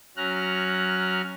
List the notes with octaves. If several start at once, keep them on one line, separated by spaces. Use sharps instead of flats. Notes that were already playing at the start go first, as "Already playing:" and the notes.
F#3 C#4 A#5 F6 F#6